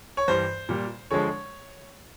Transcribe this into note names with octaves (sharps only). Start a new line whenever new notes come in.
C#5
G2 E3 G3 C5
A#2 G3
D3 F3 G#3 C#5